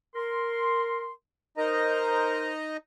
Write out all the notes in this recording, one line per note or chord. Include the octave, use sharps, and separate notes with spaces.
A#4 C6
D#4 A#4 C5 D#5 A#5